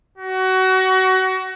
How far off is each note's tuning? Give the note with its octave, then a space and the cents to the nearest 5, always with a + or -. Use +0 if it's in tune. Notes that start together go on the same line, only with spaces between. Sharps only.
F#4 +25